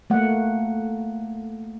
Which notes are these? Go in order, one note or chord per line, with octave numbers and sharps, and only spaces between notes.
A3 A#3 F#5